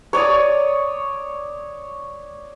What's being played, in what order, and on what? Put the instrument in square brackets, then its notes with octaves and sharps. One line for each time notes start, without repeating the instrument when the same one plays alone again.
[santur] C#5 D5 D#6